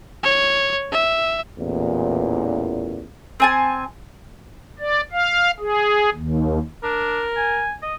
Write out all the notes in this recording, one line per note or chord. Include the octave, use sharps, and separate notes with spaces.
C#5
E5
A1 E2 A#2
C4 G#5 A5
D5
F5
G#4
D#2
D4 A#4
G#5
D#5